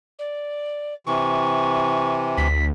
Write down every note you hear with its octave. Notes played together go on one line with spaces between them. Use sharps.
D5
C3 E3 C#6
D2 B6